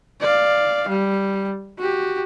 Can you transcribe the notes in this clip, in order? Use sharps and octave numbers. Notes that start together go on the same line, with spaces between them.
D5 F5
G3
F#4 G4